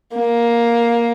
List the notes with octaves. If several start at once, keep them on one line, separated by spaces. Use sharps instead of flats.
A#3